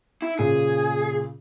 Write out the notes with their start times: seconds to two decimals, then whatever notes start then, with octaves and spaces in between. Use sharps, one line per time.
0.22 E4
0.39 A#2 C#3 G#4